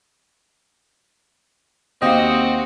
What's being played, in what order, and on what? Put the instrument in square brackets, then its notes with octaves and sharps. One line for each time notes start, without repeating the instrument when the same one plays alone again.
[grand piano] D#2 F5 A#6 [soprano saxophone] C4 [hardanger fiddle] F#4 F#5 [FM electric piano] G4 D#5